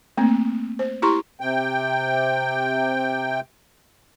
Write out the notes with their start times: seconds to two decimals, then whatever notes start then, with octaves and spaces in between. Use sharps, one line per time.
0.17 A3 A#3 C4
0.79 C5
1.02 E4 G4 A#5 C6 C#6
1.40 C3 G5